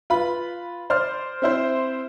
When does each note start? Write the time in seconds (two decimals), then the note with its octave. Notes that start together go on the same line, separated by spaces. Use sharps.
0.10 F4 B4 B5
0.90 C5 D5 C6 F6
1.42 C4 E4 C5